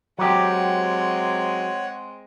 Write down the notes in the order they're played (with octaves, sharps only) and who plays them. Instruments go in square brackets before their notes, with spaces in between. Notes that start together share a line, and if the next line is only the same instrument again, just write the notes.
[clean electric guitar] F#3 G4 [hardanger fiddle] G#3 C4 [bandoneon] C#5 F#5